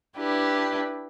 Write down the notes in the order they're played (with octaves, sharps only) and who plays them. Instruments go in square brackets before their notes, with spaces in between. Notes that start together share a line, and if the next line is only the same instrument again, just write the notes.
[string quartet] D4 E4 G4 B4